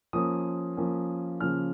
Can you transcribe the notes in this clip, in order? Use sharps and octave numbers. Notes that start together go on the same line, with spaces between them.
F3 A#3 C#4 D#6
F3 A#3 C#4
C#3 F3 A#3 C#4 F6